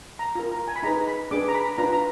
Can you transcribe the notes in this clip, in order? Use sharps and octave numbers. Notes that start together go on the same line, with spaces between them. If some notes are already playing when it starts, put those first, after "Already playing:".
A#5
F4 A#4
A#5
G#5
B5
D#4 G#4 B4 A#5
B5
D4 G#4 B4 D6
A#5
B5
D4 F4 B4 A#5
A#5